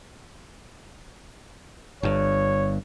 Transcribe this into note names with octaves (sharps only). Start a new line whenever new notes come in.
G1 G2 C#5